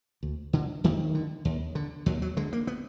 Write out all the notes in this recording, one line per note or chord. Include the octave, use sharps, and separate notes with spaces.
D2
D3
F2 D#3
D3
D#2
D3
D#2 F#3
F#3
D3 G#3
A#3
B3